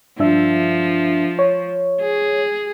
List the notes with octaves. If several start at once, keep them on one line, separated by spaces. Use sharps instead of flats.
G2 F3 D4 E5
C#5
G#4